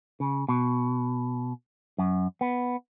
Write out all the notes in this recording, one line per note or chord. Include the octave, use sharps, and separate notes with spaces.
C#3
B2
F#2
B3